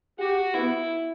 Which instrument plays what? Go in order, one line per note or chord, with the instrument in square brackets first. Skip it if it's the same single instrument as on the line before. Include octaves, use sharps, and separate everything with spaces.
[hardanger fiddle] F#4 [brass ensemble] G4
[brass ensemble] B3 [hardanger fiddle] E4